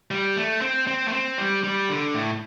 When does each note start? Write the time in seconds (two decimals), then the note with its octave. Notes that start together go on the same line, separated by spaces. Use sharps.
0.11 G3
0.36 A3
0.62 C4
0.87 C4
1.08 A3
1.13 C4
1.38 G3
1.64 G3
1.89 D3
2.14 A2